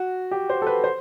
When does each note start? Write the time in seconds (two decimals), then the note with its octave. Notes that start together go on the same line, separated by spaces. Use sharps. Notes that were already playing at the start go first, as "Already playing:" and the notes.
Already playing: F#4
0.31 G4
0.50 C5
0.62 A4
0.67 B4
0.84 C5